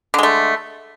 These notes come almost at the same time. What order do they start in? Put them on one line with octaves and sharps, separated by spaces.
D3 G#3 A3